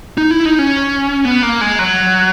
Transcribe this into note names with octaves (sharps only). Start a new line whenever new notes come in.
D#4
E4
D#4
C#4
B3
A#3
G#3
F#3